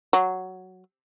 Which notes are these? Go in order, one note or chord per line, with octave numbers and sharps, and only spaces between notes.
F#3